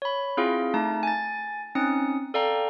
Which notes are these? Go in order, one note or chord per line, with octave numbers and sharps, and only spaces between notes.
C#5 B5
C4 E4 F4 G#4 F5
A3 D#4 A5
G#5 A6
C4 C#4 D#4 D#6 C#7
A4 D5 F5 G5 A#5